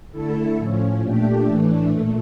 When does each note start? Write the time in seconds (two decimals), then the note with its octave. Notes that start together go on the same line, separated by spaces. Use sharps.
0.12 D3 A3 E4 A4
0.56 A2 F3 C#4
1.01 A#2 A3 D4 G4
1.45 A2 E3 A3 D4
1.90 A#2 A3